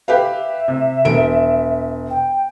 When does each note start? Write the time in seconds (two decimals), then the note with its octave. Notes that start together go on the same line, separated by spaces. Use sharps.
0.08 G4 B4 E5 F5
0.68 C3
1.05 E1 D7
2.10 G5